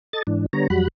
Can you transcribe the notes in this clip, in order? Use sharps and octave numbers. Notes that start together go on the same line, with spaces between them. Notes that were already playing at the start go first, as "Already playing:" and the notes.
A4 D#5 A6
G#2 E3 D4
D3 G3 B3 C#5 A#5
F2 F#3 G3 F#4 B5 F#6